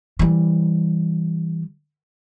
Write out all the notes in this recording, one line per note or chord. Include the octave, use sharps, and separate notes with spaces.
E3 G3